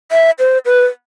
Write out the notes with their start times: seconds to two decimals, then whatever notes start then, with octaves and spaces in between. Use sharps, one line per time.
0.12 E5
0.39 C5
0.66 B4